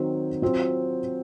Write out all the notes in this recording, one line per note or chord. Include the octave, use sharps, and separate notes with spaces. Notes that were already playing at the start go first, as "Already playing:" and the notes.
Already playing: D#3 F#3 C4
F#3 C4 F4